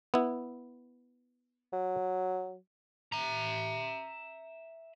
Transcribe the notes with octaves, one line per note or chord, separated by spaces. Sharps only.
B3 E4
F#3
E5 A#5